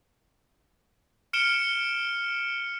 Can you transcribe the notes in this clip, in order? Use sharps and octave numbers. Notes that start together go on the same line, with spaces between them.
F6 C#7 D7 E7 G7